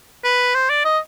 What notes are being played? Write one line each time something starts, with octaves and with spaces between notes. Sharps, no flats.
B4
C5
D5
D#5